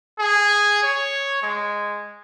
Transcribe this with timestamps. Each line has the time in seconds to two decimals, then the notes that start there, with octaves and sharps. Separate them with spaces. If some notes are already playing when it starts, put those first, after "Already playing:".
0.19 G#4
0.83 C#5
1.42 G#3